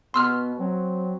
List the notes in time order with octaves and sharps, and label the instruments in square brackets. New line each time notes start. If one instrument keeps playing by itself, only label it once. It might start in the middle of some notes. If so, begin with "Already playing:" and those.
[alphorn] B2 [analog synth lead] B3 [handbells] C6 E6 F6
[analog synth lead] F#3 [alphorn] C4